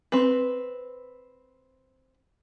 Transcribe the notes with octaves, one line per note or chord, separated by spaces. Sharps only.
C4 B4